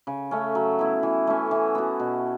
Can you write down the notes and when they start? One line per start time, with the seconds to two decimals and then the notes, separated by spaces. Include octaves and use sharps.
0.07 C#3
0.31 A3 C#4
0.55 F#3
0.79 B3 E4
1.03 E3
1.27 A3 C#4
1.51 E3
1.75 B3 F#4
2.00 B2